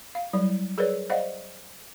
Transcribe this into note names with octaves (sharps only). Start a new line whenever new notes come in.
F5
F#3 G3 E4
G#4 A#4 B4 C#5 D5
C5 D5 D#5 F5 F#5